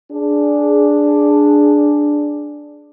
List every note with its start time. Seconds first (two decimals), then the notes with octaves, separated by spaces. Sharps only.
0.12 D4 G#4